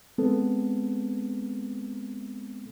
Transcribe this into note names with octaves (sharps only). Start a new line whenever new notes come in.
G#3 B3 C4 A4